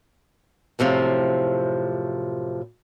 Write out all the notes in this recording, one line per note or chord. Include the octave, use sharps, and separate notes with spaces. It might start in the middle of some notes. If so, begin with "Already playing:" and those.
F#2 A2 C3 F3